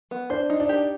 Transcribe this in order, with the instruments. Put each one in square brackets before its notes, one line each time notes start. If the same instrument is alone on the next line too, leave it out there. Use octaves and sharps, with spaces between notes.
[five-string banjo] B3
[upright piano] D4 [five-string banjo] C5
[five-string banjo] D#4
[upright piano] D4
[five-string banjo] G4